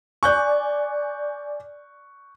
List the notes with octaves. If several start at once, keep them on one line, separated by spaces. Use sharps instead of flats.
D5 G#5 C#6 F#6 G6